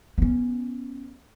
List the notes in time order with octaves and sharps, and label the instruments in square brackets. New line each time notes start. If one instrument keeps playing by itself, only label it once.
[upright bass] B3 C#4